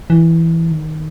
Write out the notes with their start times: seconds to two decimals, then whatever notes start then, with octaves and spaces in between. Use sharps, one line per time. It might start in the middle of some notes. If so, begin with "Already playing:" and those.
0.10 E3
0.71 D#3